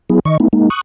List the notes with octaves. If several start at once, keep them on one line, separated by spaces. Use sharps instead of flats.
F#3 B3 E4 G#4
D#3 D#5 C#6
A3 B3 D#4 E4
G#3 A#3 D#4
C#6 D#6 F#6